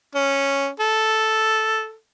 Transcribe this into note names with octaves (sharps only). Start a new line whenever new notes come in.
C#4
A4